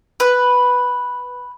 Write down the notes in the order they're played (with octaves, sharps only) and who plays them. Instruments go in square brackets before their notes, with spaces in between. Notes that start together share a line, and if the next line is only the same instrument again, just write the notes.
[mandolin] B4